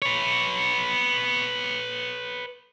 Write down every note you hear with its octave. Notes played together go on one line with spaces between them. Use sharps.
B4 C#5